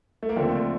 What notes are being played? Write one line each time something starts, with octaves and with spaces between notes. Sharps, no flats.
A3
A#3
D#2 D3 F3 A3 C4